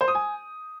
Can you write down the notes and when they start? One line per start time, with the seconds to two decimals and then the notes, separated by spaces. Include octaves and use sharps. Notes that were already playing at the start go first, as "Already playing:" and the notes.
0.01 C5
0.08 D#6
0.15 G#5